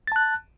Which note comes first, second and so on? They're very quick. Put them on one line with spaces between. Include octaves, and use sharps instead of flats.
A6 A5 F#6